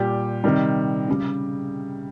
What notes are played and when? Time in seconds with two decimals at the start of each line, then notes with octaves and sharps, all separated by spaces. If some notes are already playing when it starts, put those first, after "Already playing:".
Already playing: A#2 G3 G4
0.44 C3 D#3 G3
1.08 C#3 G3